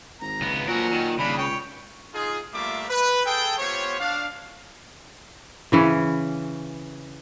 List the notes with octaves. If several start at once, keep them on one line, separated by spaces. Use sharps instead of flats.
G#1 A#5
C#2 B3
A#2 F3 F#3 C#4 A#4
D#3
D#1 C#3 D4 B5
C#2 C#5 G5
D#4 F4 G#4
G3 A3 A#3 F4 E5 D6
B4
G#4 A4 G5
B3 F4 G4 C5 C#5
D4 F5
C#3 E3 C#4